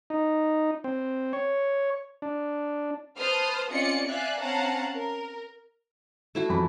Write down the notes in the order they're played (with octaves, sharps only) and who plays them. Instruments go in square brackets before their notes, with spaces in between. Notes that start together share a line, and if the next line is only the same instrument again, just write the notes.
[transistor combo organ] D#4
C4
C#5
D4
[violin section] B4 C5 A5 D#6 F6
C4 C#4 F4 D5 D#5 C#7
D5 E5 F5 G#5 F#6
C4 C#4 F5 F#5 A5 A#5
A#4
[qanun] A3 E4 F#4
[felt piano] E1 F2 B5